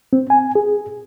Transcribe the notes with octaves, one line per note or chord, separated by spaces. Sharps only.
C4
G#5
G#4